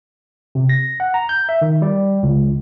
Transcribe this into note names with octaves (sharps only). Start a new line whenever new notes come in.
C3
A#6
F#5
A#5
G6
E5
D#3
G3
C#2